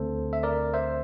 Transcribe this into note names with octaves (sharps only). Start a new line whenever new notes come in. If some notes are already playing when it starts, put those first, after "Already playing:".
Already playing: D2 D3 A3 C4 A4 C5
E5
A#4 D5
C5 E5